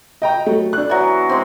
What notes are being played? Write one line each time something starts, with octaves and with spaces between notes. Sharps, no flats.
D#5 G5 A#5
F#3 A3
D4 F#6
E3 F#3 B3
G#3 C4